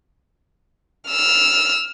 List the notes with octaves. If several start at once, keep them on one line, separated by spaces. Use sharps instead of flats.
E6 F6